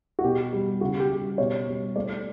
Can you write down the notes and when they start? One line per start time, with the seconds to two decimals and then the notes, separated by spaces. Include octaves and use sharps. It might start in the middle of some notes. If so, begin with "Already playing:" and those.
0.19 F#4
0.24 B2 G4
0.53 G3
0.81 C#3 F#4
1.00 G4
1.10 G3
1.38 B2 C#5
1.68 G3
1.96 A3 D5